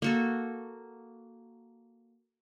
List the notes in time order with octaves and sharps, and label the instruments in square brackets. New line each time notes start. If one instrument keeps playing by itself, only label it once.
[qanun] A#3 F#4 A4